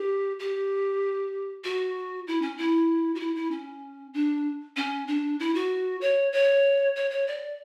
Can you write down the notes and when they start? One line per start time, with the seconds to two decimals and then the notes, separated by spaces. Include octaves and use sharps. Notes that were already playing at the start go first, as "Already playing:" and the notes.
Already playing: G4
0.39 G4
1.64 F#4
2.27 E4
2.42 C#4
2.57 E4
3.15 F#4
3.20 E4
3.36 E4
3.51 C#4
4.14 D4
4.76 C#4
5.08 D4
5.40 E4
5.55 F#4
6.01 C#5
6.33 C#5
6.96 C#5
7.11 C#5
7.27 D5